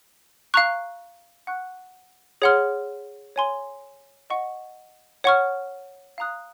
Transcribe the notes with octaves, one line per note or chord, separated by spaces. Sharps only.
F5 A#5 C#6 F#6
F#5 C#6 F#6
G#4 C#5 F#5 C6 F6
C#5 G#5 C6
D#5 F#5 C#6
C#5 F#5 C#6 F6
F5 A#5 D#6 F#6